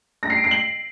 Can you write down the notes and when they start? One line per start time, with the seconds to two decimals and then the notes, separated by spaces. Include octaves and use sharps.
0.23 A#6
0.30 C7
0.37 D7
0.44 C7
0.51 F#7